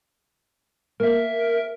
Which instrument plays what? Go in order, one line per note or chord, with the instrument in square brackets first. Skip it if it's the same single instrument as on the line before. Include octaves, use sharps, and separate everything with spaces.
[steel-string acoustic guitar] A#3 [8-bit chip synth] A#4 E5